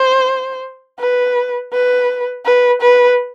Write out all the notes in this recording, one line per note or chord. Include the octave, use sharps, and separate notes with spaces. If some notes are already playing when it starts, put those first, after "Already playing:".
Already playing: C5
B4
B4
B4
B4